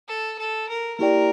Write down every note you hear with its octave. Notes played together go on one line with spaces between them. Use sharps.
A4
A4
A#4
A#3 E4 G4 A#4 D5 G5